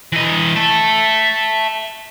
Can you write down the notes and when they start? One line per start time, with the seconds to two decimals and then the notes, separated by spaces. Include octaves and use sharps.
0.13 E3 D#5
0.56 E5 A5